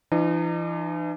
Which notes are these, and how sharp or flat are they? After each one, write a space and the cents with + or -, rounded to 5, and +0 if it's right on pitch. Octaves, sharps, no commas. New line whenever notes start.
E3 +40 D#4 -35